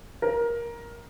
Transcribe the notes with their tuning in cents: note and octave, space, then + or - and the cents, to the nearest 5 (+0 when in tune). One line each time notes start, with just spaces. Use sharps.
A#4 +15